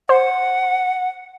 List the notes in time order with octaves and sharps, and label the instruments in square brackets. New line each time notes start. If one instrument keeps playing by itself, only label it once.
[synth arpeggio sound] C5 [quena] F#5